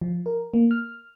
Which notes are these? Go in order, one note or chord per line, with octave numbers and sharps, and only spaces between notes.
F3
A#4
A#3
F6